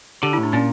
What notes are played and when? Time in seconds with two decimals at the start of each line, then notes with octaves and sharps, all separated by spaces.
0.23 D3 G4
0.33 E4
0.38 A2
0.43 D4
0.53 A#2 C#4